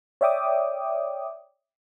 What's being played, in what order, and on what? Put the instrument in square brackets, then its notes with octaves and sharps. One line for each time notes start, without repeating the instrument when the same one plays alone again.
[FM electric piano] C#5 D5 E5 G5 D6 D#6